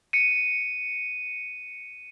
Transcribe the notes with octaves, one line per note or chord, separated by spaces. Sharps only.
C#7 D#7